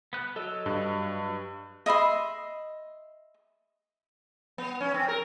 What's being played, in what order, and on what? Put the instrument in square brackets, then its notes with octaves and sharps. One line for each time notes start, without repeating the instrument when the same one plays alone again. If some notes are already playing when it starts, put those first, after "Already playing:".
[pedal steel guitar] B3 F#6
[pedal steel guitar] F#3 D#5 E6 [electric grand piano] A4
[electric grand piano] G2
[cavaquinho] D#5 E5 B5 C6
[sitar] B3
C#4
C4
A#4